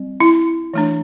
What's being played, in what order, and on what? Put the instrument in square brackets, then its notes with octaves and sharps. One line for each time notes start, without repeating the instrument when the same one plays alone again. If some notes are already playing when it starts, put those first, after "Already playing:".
Already playing: [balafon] G3 C4
E4
E3 A3 D4